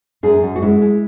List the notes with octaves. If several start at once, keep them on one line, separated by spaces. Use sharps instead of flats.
F#2 G#4
F#2
F#4
G#3 E4
G#3